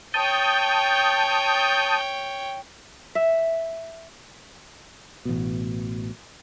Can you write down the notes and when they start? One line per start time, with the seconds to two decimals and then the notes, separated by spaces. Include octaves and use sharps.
0.14 C#5 G5 A5 D#6 G6
3.15 E5
5.25 A1 B2